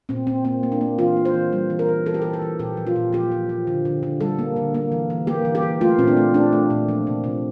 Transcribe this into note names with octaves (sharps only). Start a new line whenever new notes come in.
A#2 C4
A#2 C4
A#3 C4
A#3
D4
A#3
E3 F4
A#3
C5
E3
G3
E3
A#4
E3
E3 A4
G4
E3 A4
A4
E3
A#2 G4
F3
F4
A#2
F3 G4
F3
F3
D3
D3
D3
G3 A4
A#3
D3
A#3
E3
E3
A#3 G4
E3
G4
E3
A3 F4
A#2 C4
D4
A3
A3 D4
A3
A#2
F3
C3
C3